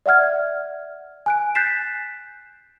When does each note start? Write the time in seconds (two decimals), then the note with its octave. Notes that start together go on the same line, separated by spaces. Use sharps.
0.06 D5 E5 F#5 F6 G#6
1.26 G#5 F#6 D7
1.55 F#6 G6 A6 B6 C7 E7